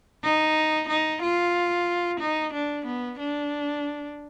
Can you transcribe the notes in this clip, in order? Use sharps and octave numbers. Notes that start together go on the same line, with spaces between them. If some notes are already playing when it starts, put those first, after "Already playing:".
D#4
D#4
F4
D#4
D4
B3
D4